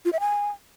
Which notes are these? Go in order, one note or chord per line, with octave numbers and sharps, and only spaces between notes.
F4
E5
G#5